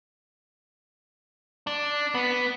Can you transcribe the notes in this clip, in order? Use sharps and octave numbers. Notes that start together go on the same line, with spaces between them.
D4
B3